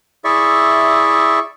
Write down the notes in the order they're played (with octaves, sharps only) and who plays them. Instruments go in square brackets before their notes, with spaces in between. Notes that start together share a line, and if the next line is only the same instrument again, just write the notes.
[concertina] E4 G#4 D5 E5 C#6